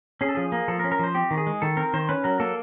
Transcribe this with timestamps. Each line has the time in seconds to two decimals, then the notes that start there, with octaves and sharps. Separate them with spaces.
0.21 C#4 G#4
0.29 A4
0.35 F3 G#4
0.52 A#3
0.68 F3 A4
0.79 A#4
0.84 C#4
0.92 A#4
0.99 F3 C5
1.15 C4 G4
1.31 D#3
1.38 G#4
1.47 G#3
1.62 D#3 A4
1.77 C4 A#4
1.93 D#3 C5
2.09 C#4 B4
2.24 F#3 A#4
2.40 A#3 A4